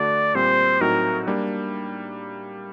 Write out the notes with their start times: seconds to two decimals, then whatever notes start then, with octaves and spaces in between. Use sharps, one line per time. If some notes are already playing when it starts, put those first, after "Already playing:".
Already playing: D3 A3 D4 F#4 D5
0.35 A#2 G3 C4 G4 C5
0.81 A2 F#3 C4 D#4 F#4 A#4
1.27 G3 A#3 D4